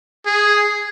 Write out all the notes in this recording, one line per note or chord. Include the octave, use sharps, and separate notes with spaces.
G#4